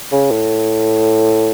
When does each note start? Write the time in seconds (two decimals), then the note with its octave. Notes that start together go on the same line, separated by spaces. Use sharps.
0.12 C#3
0.31 A2